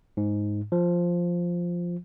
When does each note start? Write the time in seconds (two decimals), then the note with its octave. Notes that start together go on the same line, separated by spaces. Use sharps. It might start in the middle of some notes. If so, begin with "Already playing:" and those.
0.17 G#2
0.72 F3